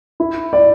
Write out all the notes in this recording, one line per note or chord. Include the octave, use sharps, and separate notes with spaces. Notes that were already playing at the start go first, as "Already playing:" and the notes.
E4
D5